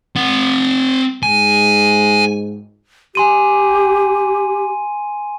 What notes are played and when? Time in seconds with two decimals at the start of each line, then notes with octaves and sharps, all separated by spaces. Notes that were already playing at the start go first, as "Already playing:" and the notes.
0.16 C4 F#5
1.23 G#2 G#5
3.15 G4 G#5 C6 D#7